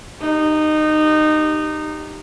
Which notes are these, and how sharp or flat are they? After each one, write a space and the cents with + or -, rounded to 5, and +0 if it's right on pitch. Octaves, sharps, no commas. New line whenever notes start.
D#4 -20 G4 +0